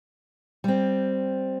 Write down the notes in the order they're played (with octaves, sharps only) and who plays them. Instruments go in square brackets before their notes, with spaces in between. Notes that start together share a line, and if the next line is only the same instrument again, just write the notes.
[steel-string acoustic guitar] G3 C4